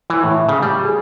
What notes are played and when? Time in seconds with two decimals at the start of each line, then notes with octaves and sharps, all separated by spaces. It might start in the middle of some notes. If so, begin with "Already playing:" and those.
0.10 E3
0.24 A2
0.49 C#3
0.62 G3
0.85 G#4